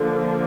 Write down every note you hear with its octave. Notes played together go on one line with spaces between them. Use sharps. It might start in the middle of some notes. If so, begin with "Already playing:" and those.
Already playing: D3 F3 A#3